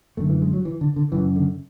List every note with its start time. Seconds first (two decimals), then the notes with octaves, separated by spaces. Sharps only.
0.17 F#2 D3 A3
0.29 E3
0.42 G#3
0.53 F#3
0.65 E3
0.81 D3
0.96 D3
1.12 F#2 C#3 E3
1.36 D3